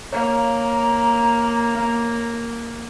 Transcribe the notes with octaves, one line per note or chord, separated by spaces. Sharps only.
A#3 C#5 F5 A#5